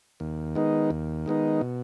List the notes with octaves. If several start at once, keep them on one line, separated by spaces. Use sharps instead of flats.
D#2
D#3 G#3 B3 D#4
D#2
D#3 G#3 B3 D#4
B2